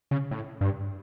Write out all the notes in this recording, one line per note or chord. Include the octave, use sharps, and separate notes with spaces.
C#3
A2
G2